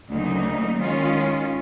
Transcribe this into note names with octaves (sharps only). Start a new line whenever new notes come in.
D2 C#3 F#3 A#3 D#4
D#3 G#3 C#4 F4